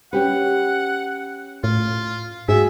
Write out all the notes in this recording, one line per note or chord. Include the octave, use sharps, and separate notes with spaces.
C#4 G4 B4 F#5
A2 F4
G#2 F#4 G#4 E5